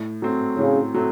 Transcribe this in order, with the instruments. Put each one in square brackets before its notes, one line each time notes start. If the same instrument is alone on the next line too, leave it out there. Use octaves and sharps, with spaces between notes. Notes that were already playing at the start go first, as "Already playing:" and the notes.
Already playing: [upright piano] A2
F#3 A3 C4
[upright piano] A2 [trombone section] C#3
[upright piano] F#3 A3 C4